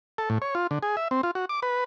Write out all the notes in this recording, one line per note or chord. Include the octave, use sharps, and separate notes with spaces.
A4
A2
C#5
F4
D3
G#4
E5
C4
F4
F#4
D6
B4